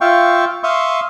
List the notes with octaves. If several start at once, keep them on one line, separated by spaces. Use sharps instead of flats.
F4 E5 F5 G5 C#6
E5 F5 C6 C#6 D#6